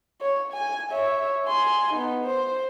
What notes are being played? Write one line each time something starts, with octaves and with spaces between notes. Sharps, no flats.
C#5
G#5
C#5 E5
G#5 C6
B3 D#4
C5